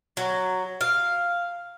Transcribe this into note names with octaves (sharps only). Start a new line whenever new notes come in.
F#3
F5